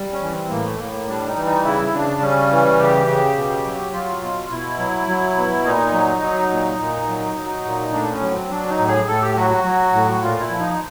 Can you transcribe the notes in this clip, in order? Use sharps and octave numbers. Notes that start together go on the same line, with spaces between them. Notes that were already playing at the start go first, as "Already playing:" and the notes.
Already playing: G3
C#4
E3
C4
A2 A#3
A3
A2 A#3
A#3
G3 D4
D#4
E3
D#4
C#3 E4
C#3 D4
G3 C#4
E3
C#3 G4
C#3
B2
F#3
F#3 F4
B2
B2 E4
F#3
F#3
B2
A#2 D#4
F#3
F#3
A#2
A#2
F#3
F#3
A#2
A2 D4
C#4
F#3
C4
F#3 D4
D#4
A2
G#4
A2 A4
G4
F#3 F#4
F#4
F#3
A2
A#2 F4
E4
F3
D#4